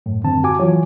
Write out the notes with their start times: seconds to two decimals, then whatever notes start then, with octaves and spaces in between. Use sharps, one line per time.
0.06 F#2 A2
0.24 F#2 D3 D#3 C4 A5
0.44 F#4 G#5 D6
0.59 E3 F#3 F4 F#4 C#5